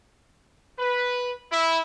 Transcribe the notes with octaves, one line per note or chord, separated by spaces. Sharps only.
B4
E4